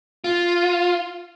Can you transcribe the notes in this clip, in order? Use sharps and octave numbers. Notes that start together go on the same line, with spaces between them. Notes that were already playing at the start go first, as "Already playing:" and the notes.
F4